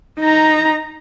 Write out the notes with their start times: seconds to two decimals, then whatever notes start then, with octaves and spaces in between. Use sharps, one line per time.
0.20 D#4 A#5